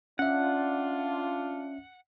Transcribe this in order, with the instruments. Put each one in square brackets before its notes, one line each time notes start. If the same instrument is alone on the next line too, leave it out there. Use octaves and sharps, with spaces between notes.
[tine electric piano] C#4 E5 [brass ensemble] D4 F4 [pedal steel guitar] F#5